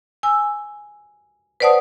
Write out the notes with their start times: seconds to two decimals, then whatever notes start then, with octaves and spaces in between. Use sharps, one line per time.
0.23 G#5 E6
1.60 B4 C5 D5 F#5 A5 D#6